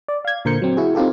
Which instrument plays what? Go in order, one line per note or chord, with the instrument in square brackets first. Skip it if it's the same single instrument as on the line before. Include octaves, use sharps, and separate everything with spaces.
[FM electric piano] D5
F5 G#6
A#2 D3 A#4 C5 G6 C#7
F#3 C4
E4 F#4 G#4
C4 D#4 F4 G4 A4